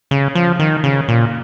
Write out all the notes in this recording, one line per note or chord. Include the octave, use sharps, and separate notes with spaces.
C#3
F3
D#3
C#3
A#2